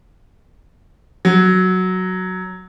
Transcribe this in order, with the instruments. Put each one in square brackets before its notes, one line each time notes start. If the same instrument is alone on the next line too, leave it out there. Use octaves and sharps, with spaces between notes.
[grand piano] F#3